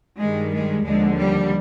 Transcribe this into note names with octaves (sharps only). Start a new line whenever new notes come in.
G2 D#3 G3 G#3
G#3
D#2 D3 F3 G#3
G3